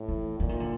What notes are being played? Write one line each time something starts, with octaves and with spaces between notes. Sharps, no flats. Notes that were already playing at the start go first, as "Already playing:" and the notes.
Already playing: A2
E3
A#2 E3
D#3
D3